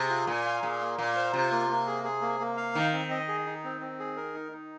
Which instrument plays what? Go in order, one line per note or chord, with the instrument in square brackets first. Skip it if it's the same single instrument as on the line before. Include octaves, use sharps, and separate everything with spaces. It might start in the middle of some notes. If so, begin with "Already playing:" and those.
Already playing: [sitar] C3 [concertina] G#4
[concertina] F4
[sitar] A#2 [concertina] G#5
[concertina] F5
[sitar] A#2 [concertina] G#4
[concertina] A#3
[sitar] A#2 [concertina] F5
[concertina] C5
[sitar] C3 [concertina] F4
[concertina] A#3
A#3
G#4
G#4
A#3
A#3
F5
[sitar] D#3 [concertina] D#4
[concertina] C4
D#5
G#4
D#4
C4
C4
G#4
A#4
D#4
D#4